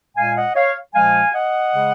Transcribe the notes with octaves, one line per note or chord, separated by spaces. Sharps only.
A#2 G#3 F5 G#5
D#5 F#5
C#5 F5
A#2 F3 G#3 F5 G#5
D#5 F#5
C#3 G#3